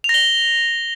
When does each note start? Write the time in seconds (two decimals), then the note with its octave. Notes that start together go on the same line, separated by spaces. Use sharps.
0.04 F7
0.09 A#6
0.14 G7